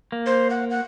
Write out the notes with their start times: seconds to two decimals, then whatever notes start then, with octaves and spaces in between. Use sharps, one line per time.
0.12 A#3
0.26 C5
0.50 F#5
0.71 F#5